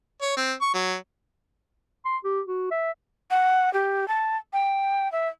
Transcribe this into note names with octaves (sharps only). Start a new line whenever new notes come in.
C#5
C4
C#6
F#3
C6
G4
F#4
E5
F#5
G4
A5
G5
E5